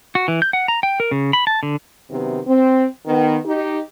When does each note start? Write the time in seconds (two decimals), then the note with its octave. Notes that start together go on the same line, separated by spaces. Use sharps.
0.15 F#4
0.28 E3
0.42 G6
0.53 F#5
0.68 A#5
0.83 G5
1.00 A#4
1.11 C#3
1.33 B5
1.47 A5
1.63 D3
2.10 F#2 C3 D#3 B3
2.46 C4
3.06 D#3 B3
3.44 D#4 G4